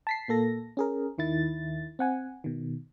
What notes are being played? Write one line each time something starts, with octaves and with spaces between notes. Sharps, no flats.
A5 B6 C7
A#2 A#3 A4 A#6
C#4 G#4 A#4
D#2 D#3 E4 A6
C4 F#5 G#5
B2 D#3